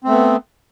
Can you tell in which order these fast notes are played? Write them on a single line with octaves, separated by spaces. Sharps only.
C4 A3 B3